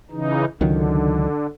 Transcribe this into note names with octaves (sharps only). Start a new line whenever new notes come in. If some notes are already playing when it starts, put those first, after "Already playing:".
C#3 E3 D#4
C#2 D3 D#3 F#3